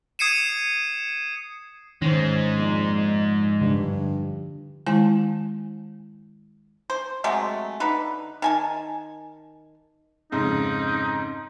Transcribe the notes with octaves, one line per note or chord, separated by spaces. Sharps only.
D#6 G#6 C7 C#7 D#7 E7
G#2 D#3 G#3 C#4 C5
F2 A#2 D#4
G2 D3
D#3 G#3 E4 G#5 A5
C5
C3 F#3 G#3 A3
D3 D#4 B4
D#3 G#5 A5
F2 G#2 C#3 D#4